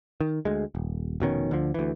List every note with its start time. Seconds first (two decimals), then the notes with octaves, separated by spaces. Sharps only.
0.21 D#3
0.45 D2 G#3
0.75 D#1
1.20 F1 B2 D#3 C#4
1.51 D2 D3 F3
1.74 D2 E3